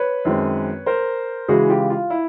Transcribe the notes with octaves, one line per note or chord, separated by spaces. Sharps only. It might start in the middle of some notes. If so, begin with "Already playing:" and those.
Already playing: B4 C#5
F#2 D#3 G#3 C4
A#4 C5
C#3 E3 G#3 F#4 G#4
F4 G4
F4
E4